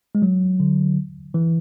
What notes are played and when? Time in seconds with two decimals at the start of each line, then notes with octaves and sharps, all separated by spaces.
0.15 G#3
0.22 F#3
0.60 D3
1.34 E3